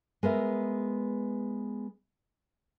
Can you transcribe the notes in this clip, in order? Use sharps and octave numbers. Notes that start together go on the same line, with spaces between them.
G#3 B3 A#4 E5